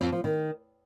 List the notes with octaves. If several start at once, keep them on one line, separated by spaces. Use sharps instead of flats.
F2
F3
D#3